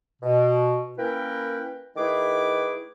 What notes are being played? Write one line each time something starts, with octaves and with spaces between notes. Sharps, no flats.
B2
A#3 C#4 E4 A#4 B4 G5
D#3 A3 E4 G#4 B4 D6